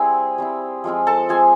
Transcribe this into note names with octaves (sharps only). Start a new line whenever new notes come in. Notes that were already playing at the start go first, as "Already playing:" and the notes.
Already playing: G3 C4 E4 G#4 G#5
G3 C4 E4
F3 G#3 C4 F4
A4 A5
F3 G#3 C4 F4 G#4 G#5